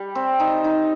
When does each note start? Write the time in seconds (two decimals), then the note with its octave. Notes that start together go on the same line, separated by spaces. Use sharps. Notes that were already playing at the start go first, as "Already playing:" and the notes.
Already playing: G3
0.15 C4
0.40 D#4
0.64 D#4